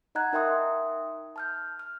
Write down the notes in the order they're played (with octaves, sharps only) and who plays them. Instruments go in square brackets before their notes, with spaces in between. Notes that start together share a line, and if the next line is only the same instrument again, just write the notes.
[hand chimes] D#4 D#5 F#5 A#5 F#6 G#6
D#4 A#4 E5 G5 C6 D#6
A5 F6 G6
F6